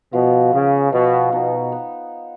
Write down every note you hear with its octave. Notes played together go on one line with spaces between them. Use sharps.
B2 F3
C#3 B3
B2 F3
B2 D#4
B3